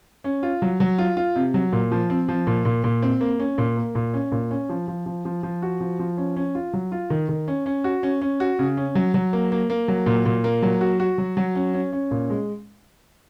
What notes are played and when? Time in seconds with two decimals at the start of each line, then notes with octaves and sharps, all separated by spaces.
0.24 C#4
0.43 F4
0.62 F#3
0.80 F#3
0.98 F4
1.17 F4
1.36 C3
1.54 F#3
1.73 A#2
1.92 F3
2.10 C4
2.29 F3
2.47 A#2
2.65 A#2
2.84 A#2
3.02 C4
3.21 A#3
3.40 C#4
3.58 A#2
3.77 A#3
3.95 A#2
4.14 C#4
4.32 A#2
4.51 C#4
4.69 F3
4.88 F3
5.06 F3
5.25 F3
5.43 F3
5.62 F#4
5.80 F3
5.99 F3
6.17 C#4
6.36 C#4
6.55 F4
6.73 F#3
6.92 F4
7.10 D#3
7.29 D#3
7.48 C#4
7.66 C#4
7.84 F#4
8.03 C#4
8.21 C#4
8.40 F#4
8.59 C#3
8.77 C#4
8.95 F#3
9.14 F#3
9.33 A#3
9.52 A#3
9.70 A#3
9.88 F#3
10.06 A#2
10.26 A#2
10.44 A#3
10.62 F#3
10.81 F#4
11.00 F#4
11.18 F#3
11.37 F#3
11.55 C#4
11.74 C#4
11.93 C#4
12.11 A#2
12.30 G#3